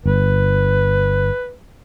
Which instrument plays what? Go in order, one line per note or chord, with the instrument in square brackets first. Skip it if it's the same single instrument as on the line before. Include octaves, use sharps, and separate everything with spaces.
[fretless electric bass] G1 [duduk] B4